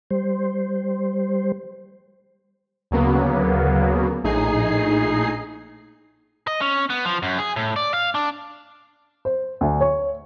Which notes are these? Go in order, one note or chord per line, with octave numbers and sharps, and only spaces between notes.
G3 C5
D2 C#3 F#3 A#3 B3
A#1 A2 D#4 G#4 C7
D#5
C#4
B3
F3
F#2
G#4
A2
D5
F5
D4
C5
D2
C#5